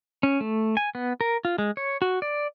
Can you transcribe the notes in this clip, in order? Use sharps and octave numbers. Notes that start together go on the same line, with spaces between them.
C#4
A3
G#5
B3
A#4
F4
G#3
C#5
F#4
D5